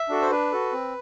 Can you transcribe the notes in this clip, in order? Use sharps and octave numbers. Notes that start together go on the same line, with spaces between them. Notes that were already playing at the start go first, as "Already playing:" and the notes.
Already playing: E5
D4 F#4 A4
C5
D4 B4
F#4 A4
C4